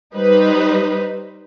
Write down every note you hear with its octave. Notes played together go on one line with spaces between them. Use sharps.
G3 D#4 B4 C5